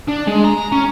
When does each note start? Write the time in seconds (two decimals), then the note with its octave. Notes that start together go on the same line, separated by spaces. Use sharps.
0.08 D4
0.27 G#3
0.44 A#5
0.72 C#4